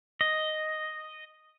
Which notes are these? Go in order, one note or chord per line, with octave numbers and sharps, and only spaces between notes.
D#5